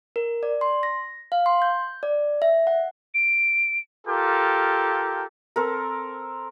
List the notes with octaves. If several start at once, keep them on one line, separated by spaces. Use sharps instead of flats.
A#4
D5
C6
A#6
F5
C6
G6
D5
E5
F#5
D7
F4 G4 A4 A#4
C4 A4 A#4